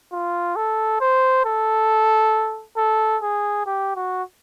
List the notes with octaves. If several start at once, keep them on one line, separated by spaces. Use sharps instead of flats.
F4
A4
C5
A4
A4
G#4
G4
F#4